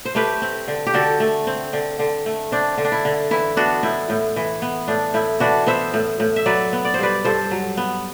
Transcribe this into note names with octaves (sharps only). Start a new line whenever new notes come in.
C5
A3 G4 B4
C4
D3
G4
D3 F#4 A4
A3
C4
D3
D3
A3
C4 D4
D3
D4
E4
D3
E3 E4
B3 D4 F#4
A2 E4
A2
E3
B3
A2 D4
A2 E4
E3 D4 F#4
B3 C5 E5
A2
A2
E5
F#3 B4 D5
B3
D5
C5
G2 B4 D5
G2 A4 C5
F#3
B3